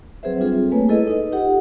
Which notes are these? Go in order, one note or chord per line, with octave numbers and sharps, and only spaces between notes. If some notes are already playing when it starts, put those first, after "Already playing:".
F#3 C4 G#4 B4 C5 E5
G3 C4 D4 F4 G#4 A4
A3 A#3 B4 C#5 G#5
E4 G#4 A4 B4 D#5
D#4 B4 D#5
D#4 F4 G4 A4 F#5